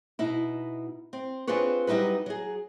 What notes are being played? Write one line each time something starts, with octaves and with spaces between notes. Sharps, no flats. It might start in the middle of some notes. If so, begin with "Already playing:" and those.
B2 D#4 E4
C4
C4 D4 F4 G#4 B4 C#5
F#3 G3 D#4 E4 B4
F#3 G#4